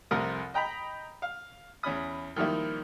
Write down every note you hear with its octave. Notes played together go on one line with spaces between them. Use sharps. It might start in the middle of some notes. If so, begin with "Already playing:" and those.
C2 F2 C3 A#4 D#6
D#5 G5 A#5 B5
F5
E2 C#4 B5 D#6
D#3 F3 G3 A#3 E4